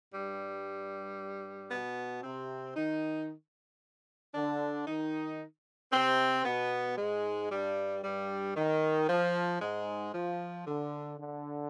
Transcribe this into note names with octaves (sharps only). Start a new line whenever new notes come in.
G2 G3
B2 B3
C3 C4
D#3 D#4
D3 D4
D#3 D#4
C3 C4
B2 B3
G#2 G#3
G2 G3
G2 G3
D#3
F3
G#2 G#3
F3
D3
D3